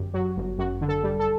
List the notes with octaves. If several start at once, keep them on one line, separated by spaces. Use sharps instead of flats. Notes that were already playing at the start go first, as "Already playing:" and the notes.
Already playing: G1 F#2 G4
F#3 F#4
G1
F#2 F#4
D3
A4
G3
A4